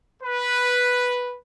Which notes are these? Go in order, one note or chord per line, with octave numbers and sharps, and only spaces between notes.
B4